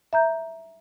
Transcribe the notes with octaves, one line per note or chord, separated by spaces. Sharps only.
E5 A#5 G6